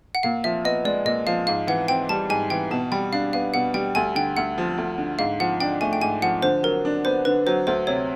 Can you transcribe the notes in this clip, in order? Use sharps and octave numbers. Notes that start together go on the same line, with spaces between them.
F#5
A#2 F5
F3 E5
B3 D#5
G#3 D5
A#2 D#5
F3 F5
G#2 F5
E3 F#5
C4 G5
G3 A5
G#2 G#5
E3 G5
B2 A5
G3 G5
D4 F5
B3 F5
B2 F#5
G3 G5
D2 G#5
D3 G5
D2 F#5
F3
D2
D3
G#2 F5
F3 F#5
D4 G5
A3 G#5
G5
G#2 G#5
F3 F#5
D3 C5
F#3 A#4
D4
B3 C5
D3 B4
F#3 C5
D2 C5
C3 C#5